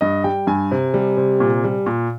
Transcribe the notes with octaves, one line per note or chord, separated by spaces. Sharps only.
G2 D#5
G3 G5
G2 G#5
C3
G3
C3
A#2
G3
A#2